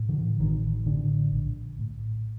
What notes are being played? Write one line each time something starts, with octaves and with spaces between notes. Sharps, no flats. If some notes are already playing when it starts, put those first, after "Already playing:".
Already playing: A2
D3 E3
A1 D#3
A2 D3
A#1
A2